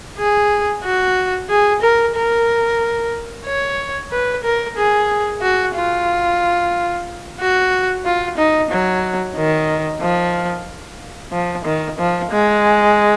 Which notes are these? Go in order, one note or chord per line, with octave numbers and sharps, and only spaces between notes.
G#4
F#4
G#4
A#4
A#4
C#5
B4
A#4
G#4
F#4
F4
F#4
F4
D#4
F#3
D#3
F3
F3
D#3
F3
G#3